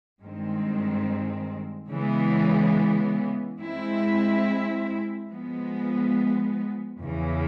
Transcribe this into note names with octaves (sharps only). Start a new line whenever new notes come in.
G2 D#3 G#3 C4
C#3 E3 G#3 B3
G#3 C4 E4
F3 G#3 B3
E2 C#3 E3